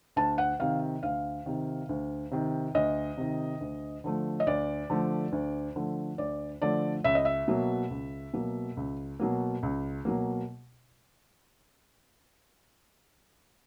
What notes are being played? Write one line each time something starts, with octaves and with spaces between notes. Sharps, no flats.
D2 A5
F#5
C3 D#3 F5
D2 F5
C3 D#3
D2
C3 D#3
D2 D#5
C3 D#3
D2
D3 F3 A3
D#5
D2 D5
D3 F3 A3
D2
D3 F3 A3
D2 D5
D3 F3 A3 D5
C#2 E5
D#5
E5
B2 F#3 A#3
C#2
B2 F#3 A#3
C#2
B2 F#3 A#3
C#2
B2 F#3 A#3